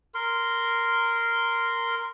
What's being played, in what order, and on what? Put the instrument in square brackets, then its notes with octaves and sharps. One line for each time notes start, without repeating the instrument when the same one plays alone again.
[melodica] A#4 C6